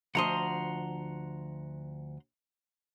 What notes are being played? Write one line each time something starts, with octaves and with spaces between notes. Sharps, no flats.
D2 F3 D#5 F#5 A#5 C6